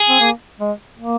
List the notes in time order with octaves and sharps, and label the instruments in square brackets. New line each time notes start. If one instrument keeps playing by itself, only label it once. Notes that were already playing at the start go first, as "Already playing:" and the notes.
Already playing: [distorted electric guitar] G#4
[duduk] C4
A#3
G#3
A#3